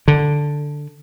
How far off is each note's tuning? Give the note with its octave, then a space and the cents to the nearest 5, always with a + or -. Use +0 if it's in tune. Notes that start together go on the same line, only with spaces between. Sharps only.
D3 +0